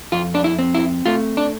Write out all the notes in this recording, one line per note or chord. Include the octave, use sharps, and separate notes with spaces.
F2 F4
D4
E4
C4
E4
A3 F4
D4